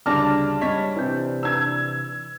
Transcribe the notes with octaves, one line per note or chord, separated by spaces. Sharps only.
D2 C#3 G3 D4 A5 D6 F6 A#6
G3 C#4 C#5 D#5 B6
C3 E3 C4 E4 D5 G6
D4 B4 E6 G#6